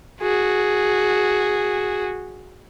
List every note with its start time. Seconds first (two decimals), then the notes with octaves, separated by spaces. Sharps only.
0.21 F#4 G#4